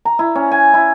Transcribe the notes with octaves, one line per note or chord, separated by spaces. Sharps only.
A#5
E4
C#4
G#5
E4